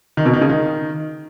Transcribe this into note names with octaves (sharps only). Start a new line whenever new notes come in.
D#3
B2
D#3
C#3
D#3